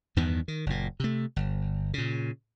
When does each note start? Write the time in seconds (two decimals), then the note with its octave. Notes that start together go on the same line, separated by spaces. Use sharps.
0.16 E2 G2 D#3 B3
0.48 D#3
0.66 F#1 A#2
1.00 C3 A3
1.36 G1
1.94 A#2 C#3